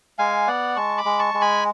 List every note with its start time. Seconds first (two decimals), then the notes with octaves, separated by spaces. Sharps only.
0.18 G#3 F5 G#5
0.47 B3 D5 F#5
0.76 G#3 A5 C#6
0.98 B5 D6
1.05 G#3
1.19 A5 C#6
1.34 G#3
1.41 G#5 B5